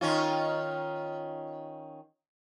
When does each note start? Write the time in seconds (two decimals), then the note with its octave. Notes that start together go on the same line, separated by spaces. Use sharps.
0.01 D#3 C#4 F4